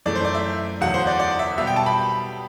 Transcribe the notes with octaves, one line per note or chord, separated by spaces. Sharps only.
F#2 E3 A3 D5
C5
D5
E5
E2 D3 F#3 F#5
C5
D5
D5
E5
B2 G3 B3 E5
G5
A5
B5